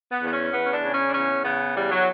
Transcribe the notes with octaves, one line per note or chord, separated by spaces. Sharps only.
B3
E2 B3
C#4
E2 B3
C#4
D4
C#3
C#4
D4
E2 C#4
C#3 B3
E2 G3
F#3